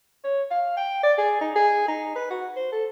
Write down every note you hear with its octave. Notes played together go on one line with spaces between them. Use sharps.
C#5
F5
G5
D5
G#4
D#4
G#4
D#4
B4
F#4
C5
A4